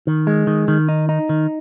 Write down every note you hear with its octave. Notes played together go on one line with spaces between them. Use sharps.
D#3
G#3
D#3
D#3
D#4
D#4
D#3